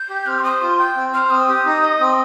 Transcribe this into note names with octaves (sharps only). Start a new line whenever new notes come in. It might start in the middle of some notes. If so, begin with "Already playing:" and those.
Already playing: G6
G4
C4 F6
C6
C5 D#6
F4 C6
G5 G6
C4
C5 F6
C4 D#6
G4
D#4
D#5
C4